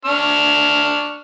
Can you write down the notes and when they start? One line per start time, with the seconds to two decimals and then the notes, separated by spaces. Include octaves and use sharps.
0.05 D4 C#6 F6